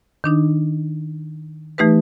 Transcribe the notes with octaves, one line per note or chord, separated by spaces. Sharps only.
D#3 D4 D#4
E3 A3 D#4 G4 B4